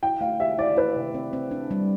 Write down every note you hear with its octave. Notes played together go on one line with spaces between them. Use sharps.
E4 G5
A3 F5
G4 E5
E4 D5
E4 B4
C3
C4
C4
D4
G3